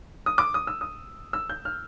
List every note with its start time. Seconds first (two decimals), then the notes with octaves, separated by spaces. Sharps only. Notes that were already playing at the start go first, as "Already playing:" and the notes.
0.26 D#6
0.38 D6
0.54 D#6
0.67 E6
0.81 D#6
1.33 E6
1.50 G6
1.65 F6